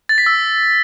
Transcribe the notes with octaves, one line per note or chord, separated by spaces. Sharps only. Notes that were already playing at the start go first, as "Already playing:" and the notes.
A6
B6
E6